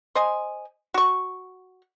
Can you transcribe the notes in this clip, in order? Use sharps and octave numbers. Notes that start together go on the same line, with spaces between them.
C5 D#5 G#5
F#4 C#6